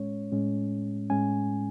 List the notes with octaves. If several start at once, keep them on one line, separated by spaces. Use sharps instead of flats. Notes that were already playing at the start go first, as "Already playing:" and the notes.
Already playing: A2 G#3 C#4 C#5
A2 G#3 C#4
A2 G#3 C#4 G#5